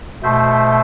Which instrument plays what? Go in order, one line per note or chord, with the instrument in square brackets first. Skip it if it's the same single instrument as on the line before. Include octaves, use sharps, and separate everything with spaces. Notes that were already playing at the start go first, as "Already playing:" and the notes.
[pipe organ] B2 A3 C5